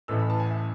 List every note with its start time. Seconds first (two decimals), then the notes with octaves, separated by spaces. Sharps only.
0.08 A1 A2 E3 A3 E6
0.19 B5
0.30 A5
0.40 G#5
0.50 E5